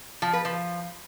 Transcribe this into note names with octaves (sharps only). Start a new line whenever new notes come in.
F3
B4
F3